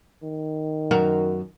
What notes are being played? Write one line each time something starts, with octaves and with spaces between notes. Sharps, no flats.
D#3
F#2 F#4 A#4